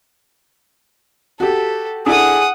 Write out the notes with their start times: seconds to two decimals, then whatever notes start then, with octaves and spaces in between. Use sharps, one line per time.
1.40 F#4 G4 A4
2.06 D4 E4 G#4 A4 F#5 D#6